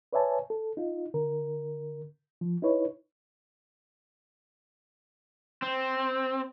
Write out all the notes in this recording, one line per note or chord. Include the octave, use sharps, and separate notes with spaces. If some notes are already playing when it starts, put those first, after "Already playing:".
B4 C#5 D5 E5 G#5 A5
A4
D#4 F4
D3 A#4
F3
D#4 E4 B4 C#5
C4